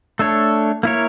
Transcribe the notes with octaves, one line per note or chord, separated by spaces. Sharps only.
A3 D4 A4 C#5
A#3 E4 A#4 C#5